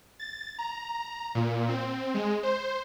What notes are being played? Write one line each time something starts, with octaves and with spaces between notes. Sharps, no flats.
A6
A#5
A#2
C4
G#3
C5